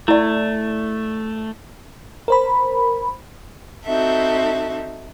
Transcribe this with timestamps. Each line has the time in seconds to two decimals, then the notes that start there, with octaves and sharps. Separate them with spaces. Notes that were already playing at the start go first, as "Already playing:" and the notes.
0.08 A3 E4 D5
2.28 A#4 C5 B5
3.85 C4 D#4 F#4 A4 E5